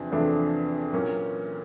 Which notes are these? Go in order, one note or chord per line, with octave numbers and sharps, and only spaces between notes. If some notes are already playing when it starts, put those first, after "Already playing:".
Already playing: E2 C3 F3 D4
E2 C3 F3 A3 D4
A#2 F#3 A#3 C#4